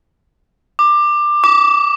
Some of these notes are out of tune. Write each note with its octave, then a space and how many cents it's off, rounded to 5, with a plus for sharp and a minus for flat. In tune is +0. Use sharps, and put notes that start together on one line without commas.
D6 +20
D6 -25